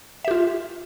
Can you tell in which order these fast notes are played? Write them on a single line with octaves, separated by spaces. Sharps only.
E5 G4 F4